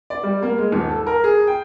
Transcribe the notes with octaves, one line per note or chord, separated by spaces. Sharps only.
D5
G3
A#3
G#3
D#1
A4
A#4
G#4
G5